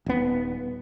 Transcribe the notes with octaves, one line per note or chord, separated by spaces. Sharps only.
D#1 B3